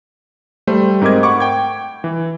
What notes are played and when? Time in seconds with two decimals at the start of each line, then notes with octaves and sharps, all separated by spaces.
0.67 G3 A3 C5
1.02 G#2 C4 A#4 D#5 D6 G#6
1.23 F#5 B5 C#6 D6
1.40 G5 G#6
2.04 E3